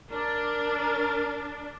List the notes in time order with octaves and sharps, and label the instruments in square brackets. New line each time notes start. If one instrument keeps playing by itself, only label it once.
[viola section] D4 [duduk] A#4